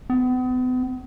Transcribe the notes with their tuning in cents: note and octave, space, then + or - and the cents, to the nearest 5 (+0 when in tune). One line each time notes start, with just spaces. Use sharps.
B3 +40